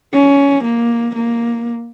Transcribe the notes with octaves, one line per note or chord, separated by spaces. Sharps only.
C#4
A#3
A#3